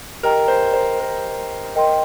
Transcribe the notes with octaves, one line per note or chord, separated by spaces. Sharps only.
G4 A#4 D#5 G5 A#5
C5
C5
A#4
A#4 D#5 G5 C6